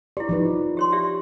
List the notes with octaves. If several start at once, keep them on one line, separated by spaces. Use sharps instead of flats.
E4 G4 D5
F3 D#4 B4
G4 C#5 C6
G4 D5 E5